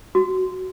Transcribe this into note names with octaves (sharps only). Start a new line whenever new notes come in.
F#4